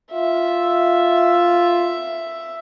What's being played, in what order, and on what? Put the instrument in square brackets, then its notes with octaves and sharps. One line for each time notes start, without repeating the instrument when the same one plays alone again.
[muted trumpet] F4 [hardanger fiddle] E5